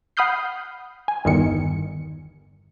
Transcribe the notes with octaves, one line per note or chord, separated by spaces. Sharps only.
F#5 B5 D#6 F6 G6 C7
G#5
G1 E2 D#3 C#7